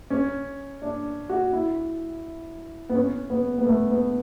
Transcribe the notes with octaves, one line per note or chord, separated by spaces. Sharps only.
C#4
D4
F#4
E4
B3
C#4
B3
B3
A3
B3